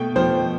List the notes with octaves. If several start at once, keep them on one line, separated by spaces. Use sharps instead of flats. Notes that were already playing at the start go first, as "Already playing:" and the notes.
Already playing: B2 A3 G5
F3 C5